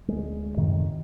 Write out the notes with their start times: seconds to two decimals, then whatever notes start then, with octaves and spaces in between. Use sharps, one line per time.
0.08 D2 G#3
0.57 F#2 A2 C3 D#3